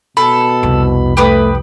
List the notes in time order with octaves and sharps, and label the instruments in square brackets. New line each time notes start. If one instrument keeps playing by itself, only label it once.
[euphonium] B2 [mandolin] A4 [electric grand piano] B5
[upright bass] C2 F2
[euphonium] A3 [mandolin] G4 B4 D#6